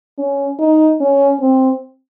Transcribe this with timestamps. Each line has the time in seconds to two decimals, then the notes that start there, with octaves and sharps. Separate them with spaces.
0.18 C#4
0.59 D#4
1.01 C#4
1.41 C4